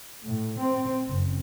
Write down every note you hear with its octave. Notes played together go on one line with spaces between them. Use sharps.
A2
C4
F#1